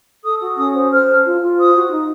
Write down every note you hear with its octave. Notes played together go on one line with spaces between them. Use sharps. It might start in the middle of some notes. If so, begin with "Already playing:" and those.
A4 D#6
F#4
C#4 D#6
C5
C5 F6
A4
F4
F4
C5 D#6
F#4
D#4